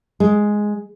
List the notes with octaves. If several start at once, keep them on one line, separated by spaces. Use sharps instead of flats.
G#3